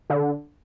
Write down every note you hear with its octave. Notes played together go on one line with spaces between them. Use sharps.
D3